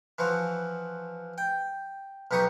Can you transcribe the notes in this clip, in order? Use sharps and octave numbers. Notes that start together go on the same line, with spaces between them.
E3 F3 F#4
G5
B1 B2 D#4 G4 C#6 D#6